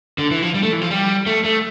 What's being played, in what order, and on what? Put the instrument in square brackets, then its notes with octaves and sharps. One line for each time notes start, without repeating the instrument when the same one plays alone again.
[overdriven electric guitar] D3
E3
F3
G3
A3
E3
F3
G3
A3
A3